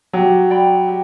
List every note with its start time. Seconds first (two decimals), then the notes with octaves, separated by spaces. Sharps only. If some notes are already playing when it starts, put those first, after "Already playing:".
0.13 F#3 G4
0.50 D5 G5 B5
0.88 G4